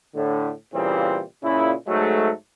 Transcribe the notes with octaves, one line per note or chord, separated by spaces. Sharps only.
A2 D3
A#2 C#3 E3 G3 A#3 C4
A#2 C#3 E4
G#2 F#3 G#3 A3